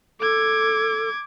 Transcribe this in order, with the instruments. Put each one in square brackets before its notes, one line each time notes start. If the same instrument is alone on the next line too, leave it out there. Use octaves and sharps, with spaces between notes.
[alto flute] A4 [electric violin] D6 G#6